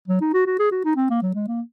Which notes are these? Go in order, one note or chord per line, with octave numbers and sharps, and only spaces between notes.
F#3
D#4
F#4
F#4
G#4
F#4
D#4
C4
A#3
F#3
G#3
A#3